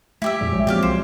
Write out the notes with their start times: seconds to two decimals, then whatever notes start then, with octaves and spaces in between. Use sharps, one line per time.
0.22 A3 E4 G4 E5
0.41 F2 A#2 G3 G#4 D5
0.53 A#1 F#3 G#3 C#5
0.67 F3 A3 A#3 C4 G4 D5 F5
0.83 C2 C5